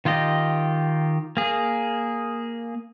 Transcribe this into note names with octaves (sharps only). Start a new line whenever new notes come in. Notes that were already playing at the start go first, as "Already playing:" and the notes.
D#3 F4 G4 D#5
A#3 G#4